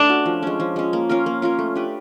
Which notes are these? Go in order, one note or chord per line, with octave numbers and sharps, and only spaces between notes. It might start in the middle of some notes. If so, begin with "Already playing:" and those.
Already playing: A3 D4 D#4
C#4 F#4
F3
G#3 C#4
F3
G#3 C#4
A#3
C#4 F4 A#4
A#3
C#4 F4 A#4
A3
D4 G4 B4